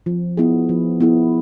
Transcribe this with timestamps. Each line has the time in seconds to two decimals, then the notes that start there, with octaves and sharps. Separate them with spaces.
0.06 F3
0.37 B3 E4 G#4
0.69 F3
1.01 B3 E4 G#4